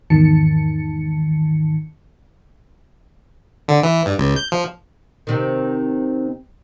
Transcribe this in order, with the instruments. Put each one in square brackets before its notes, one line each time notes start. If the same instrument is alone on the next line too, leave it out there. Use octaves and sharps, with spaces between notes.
[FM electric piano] E2 G#2 D#3 A5 C#7
[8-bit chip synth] D3
E3
G2
C#2
G6
F3
[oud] C3 D#3